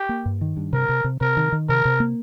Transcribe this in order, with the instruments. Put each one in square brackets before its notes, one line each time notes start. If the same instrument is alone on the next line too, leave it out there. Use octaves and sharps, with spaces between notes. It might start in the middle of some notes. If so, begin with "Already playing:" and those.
Already playing: [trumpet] G4
[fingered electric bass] A#3
G2
D#3
G2
[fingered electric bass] C3 [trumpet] A#4
[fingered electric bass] C3
C3
[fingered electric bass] C3 [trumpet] A#4
[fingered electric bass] D#3
D#3
[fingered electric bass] C3 [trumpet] A#4
[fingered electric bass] C3
A#3